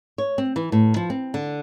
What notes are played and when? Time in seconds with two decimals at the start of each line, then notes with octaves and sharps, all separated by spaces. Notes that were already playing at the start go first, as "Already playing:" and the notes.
0.18 C#5
0.38 C4
0.56 E3
0.72 A2
0.96 F3
1.10 C4
1.34 D3